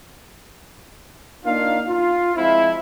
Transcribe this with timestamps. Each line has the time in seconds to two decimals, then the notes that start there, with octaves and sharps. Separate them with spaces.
1.45 A#3 D4 D#4 F4 F5
1.88 F4
2.36 F3 G#3 C4 E4